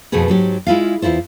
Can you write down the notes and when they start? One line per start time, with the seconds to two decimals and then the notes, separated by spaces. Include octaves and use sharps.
0.12 F2 B2 A3 F#4 G#4 B4
0.28 G#2 F#3 G4
0.67 G#3 E4 F4 F5
1.02 E2 G#2 E4 F4 C5